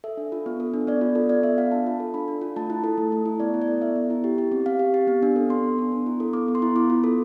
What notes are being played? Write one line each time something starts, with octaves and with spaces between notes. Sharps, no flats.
A4 E5
D4
F4
B3
A4
D4
B3 D5
F4
A4
B3 D5
B3 E5
F4 F5
D4 A5
F4
A4
D4 B5
D4
F4
A3 A5
E4
A4
A3
A3
E4
B3 D5
E4
D5
A4
B3 E5
B3
E4
G4
G4
C4
C4 F5
G4
G4
B3
D4
A4
B3 C6
B3
D4
B3
E4
A4
B3 D6
B3
C6
E4
B3 D6
F4
A4